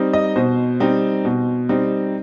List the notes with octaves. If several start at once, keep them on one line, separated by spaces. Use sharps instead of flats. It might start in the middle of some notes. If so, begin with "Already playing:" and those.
Already playing: G3 C4 D#4
D#5
B2 C5
G3 C4 D#4
B2
G3 C4 D#4